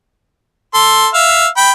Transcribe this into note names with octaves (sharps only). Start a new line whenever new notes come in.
A4 C6
E5 F5
G5 B5